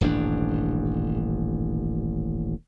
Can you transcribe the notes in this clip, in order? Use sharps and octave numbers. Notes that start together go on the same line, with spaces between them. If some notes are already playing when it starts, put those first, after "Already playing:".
D#1 A1 G2 D4